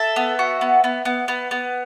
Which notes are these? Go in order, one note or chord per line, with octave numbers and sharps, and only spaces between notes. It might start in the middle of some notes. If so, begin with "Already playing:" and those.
Already playing: A4 E5
B3
F#4
B3
B3
B3
B3
B3